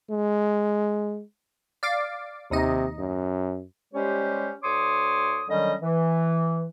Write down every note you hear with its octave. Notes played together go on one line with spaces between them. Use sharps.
G#3
D5 F5 D6
D#2 C3 D#4 D#5
F#2
G3 G#3 C#4 G4 C5 C#5
D2 C#5 C6 D6 D#6
D3 D#3 F#3 G3 C#4 D#5
E3